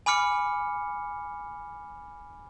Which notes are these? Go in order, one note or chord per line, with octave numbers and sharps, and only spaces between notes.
G#5 B5 D6 F6 C#7